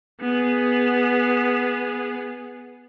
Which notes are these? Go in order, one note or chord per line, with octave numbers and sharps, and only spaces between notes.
B3 G#4